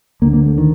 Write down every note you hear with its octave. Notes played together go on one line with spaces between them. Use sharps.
D2 D3 A#3
A#3
A3
D#3